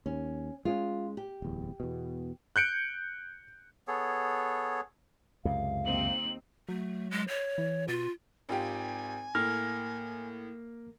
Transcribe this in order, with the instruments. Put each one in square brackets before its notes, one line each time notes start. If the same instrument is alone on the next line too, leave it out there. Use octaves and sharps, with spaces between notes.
[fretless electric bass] D#2 [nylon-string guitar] C#4
[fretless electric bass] G#3 B3 C#4 [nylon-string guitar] F4
[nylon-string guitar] G4
[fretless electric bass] D1 E2
E2 B2
[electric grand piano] F#6 G6 C#7 D7
[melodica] B3 G#4 A4 C#5
[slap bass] C#2 F#2 C3 [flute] F5
[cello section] D#2 C4 D#4 [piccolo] F#7
[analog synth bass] F#3 [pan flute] A3
[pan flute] G#3
C#5
[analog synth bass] E3
[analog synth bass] B2 [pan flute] F4
[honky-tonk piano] G#1 F4 G4 [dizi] G#5
[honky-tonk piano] A2 [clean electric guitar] A#3 [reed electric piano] F6